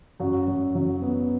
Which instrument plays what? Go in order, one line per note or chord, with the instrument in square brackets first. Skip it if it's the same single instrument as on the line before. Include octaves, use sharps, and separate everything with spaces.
[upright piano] F#2 F#4
F#2
F#3
B3